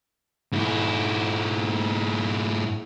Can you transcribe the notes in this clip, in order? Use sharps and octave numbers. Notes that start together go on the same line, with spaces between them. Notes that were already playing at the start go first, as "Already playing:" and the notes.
G#2 E4